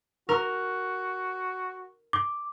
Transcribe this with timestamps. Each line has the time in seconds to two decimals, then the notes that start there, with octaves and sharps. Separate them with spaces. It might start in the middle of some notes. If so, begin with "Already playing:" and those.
0.29 F#4 A#4
2.13 D6